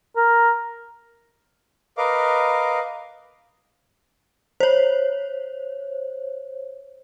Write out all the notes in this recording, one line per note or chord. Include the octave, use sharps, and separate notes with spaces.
A#4
A#4 B4 D#5 F5 D6
C5 C#5